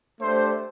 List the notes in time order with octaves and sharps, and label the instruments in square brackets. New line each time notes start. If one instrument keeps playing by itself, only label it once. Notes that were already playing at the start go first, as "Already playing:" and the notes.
[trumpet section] A3 D4 G4 C5